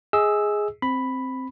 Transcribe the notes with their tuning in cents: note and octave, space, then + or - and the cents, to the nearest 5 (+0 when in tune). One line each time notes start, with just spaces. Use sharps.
G#4 +0 D#5 +30 E6 +0
C4 +0 B5 +0